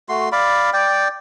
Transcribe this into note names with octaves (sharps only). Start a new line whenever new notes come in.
A3 F#4 C6
D5 F5 B5
D5 G5